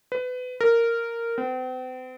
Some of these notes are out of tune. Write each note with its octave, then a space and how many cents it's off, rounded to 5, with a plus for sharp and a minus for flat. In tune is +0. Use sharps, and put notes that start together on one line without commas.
B4 +25
A#4 -10
C4 -40